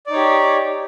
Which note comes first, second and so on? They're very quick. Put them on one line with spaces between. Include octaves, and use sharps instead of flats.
D5 D#4 C#5 G4